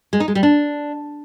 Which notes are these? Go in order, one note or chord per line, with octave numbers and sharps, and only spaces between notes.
G#3
D#4
G#3
G3
D4